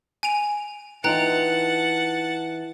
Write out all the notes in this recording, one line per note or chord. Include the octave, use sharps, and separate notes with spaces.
G#5 D7 F7
E3 D#4 F4 F#5 G5 A5 A#5 F#6